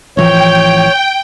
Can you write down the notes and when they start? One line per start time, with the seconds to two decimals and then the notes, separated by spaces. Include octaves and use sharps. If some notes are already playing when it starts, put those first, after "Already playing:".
0.17 A1 E3 F3 C#5 G5